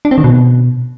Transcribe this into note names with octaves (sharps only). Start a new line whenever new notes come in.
D4
C4
D#3
B2